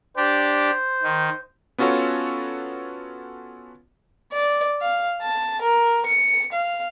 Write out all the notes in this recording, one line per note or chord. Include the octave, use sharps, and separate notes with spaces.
D4 G4 C5
D#3
B3 C#4 F4 F#4 A4 C#5
D5
F5
A5
A#4
C#7
F5